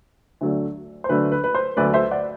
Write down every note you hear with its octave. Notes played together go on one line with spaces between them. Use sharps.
D2 D3 F#3 A3 D4
C5
D2 D3 F#3 A3 D4 B4
B4
B4
C5
D2 D3 F#3 A3 D4 B4 D5
C5 E5
D5 F#5